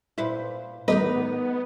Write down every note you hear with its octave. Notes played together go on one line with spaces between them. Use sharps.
A#2 E4 B4 C5
A1 A2 G3 B3 D#4 A#4 B4 D#5